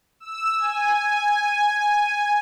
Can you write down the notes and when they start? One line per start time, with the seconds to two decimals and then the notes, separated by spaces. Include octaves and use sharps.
0.20 E6
0.58 G#5